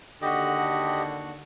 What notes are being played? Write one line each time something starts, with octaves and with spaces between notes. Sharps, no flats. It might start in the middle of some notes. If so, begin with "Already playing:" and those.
D#2 D3 F#4 G4 D#5